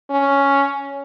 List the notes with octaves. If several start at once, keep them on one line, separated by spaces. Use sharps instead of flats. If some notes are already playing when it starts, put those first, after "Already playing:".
C#4